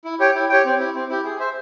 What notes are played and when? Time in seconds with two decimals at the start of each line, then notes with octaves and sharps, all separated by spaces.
0.05 E4
0.20 G4 C#5 G5
0.35 E4
0.49 G4 C#5 G5
0.65 C4
0.80 E4 G4
0.95 C4
1.10 E4 G4
1.25 G#4
1.39 C5 E5